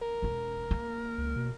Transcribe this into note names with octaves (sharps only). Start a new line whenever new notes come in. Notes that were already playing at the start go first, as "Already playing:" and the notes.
A#4
E1 C#4
A#3
C#2
B2